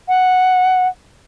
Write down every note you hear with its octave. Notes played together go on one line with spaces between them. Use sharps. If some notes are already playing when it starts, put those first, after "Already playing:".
F#5